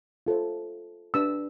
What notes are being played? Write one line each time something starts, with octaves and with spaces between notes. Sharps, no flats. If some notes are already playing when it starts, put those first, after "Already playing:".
F4 A4 C5
D4 G4 B4 E6